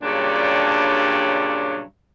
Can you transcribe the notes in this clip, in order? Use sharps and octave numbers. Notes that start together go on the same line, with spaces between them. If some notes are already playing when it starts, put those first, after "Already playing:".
G2 A#2 C#3 F#3 G3 D4